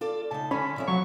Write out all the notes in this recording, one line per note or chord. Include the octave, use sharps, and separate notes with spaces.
F4 A4 D5
C#3 D#4 A5
D3 C#4 B5
C3 F3 E5
F#3 C#6